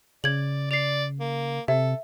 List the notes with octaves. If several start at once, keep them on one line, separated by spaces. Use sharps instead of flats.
C#3 D5 G#6 F#7
D5 C7 F7
A#3
C3 A4 E5